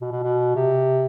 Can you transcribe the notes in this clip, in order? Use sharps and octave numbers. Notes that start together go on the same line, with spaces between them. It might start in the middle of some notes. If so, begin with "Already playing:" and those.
B2
B2
B2
C3